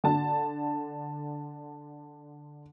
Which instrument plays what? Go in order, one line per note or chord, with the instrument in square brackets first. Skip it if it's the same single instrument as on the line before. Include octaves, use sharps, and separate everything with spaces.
[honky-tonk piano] D3 A5